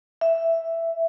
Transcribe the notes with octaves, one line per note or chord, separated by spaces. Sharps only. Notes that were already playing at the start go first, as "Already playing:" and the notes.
E5